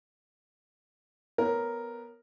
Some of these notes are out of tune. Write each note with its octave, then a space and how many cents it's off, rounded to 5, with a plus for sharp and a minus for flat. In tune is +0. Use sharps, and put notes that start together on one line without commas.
B3 +0 A#4 +0 C#5 +0